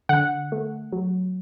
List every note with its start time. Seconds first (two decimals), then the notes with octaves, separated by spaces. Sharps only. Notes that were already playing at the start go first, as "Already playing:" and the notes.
0.09 D3 F#5
0.52 A3
0.92 F#3